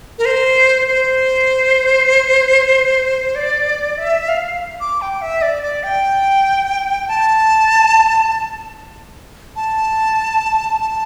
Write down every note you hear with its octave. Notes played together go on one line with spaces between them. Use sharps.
A#4
C5
C5
D5
E5
F5
D6
G5
E5
D5
D5
G5
A5
A5
A5